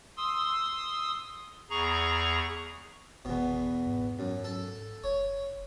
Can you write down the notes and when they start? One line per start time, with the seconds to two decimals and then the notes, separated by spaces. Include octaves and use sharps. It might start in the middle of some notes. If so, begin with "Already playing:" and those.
0.17 C6 D#6 E6
1.70 E2 G#4 A#5 C#6
3.25 G1 E2 B2
3.87 G#2
4.19 F#2
4.44 A4
5.04 F#1 C#5